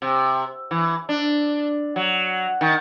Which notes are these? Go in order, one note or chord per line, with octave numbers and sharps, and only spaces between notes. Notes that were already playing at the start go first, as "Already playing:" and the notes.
C3
E3
D4
F#3
D#3